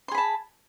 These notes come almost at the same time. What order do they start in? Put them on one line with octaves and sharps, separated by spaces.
C6 G#4 B5 A5